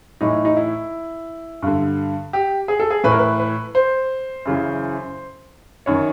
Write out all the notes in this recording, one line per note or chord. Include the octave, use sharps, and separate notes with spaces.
A2 E3 D#4
D#4
E4
G2 D3
G4
G#4
A4
G#4
A2 E3 B4
A#4
B4
B4
C5
F#2 C#3 E3
F#2 D#3 C#5